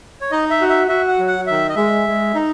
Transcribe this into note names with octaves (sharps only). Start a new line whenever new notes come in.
C#5
D#4 D#5
E5
F#4
E5
F#4 E5
F#5
F#3
F#5
D#3 E5
D#5
G#3 E5
G#3
D#4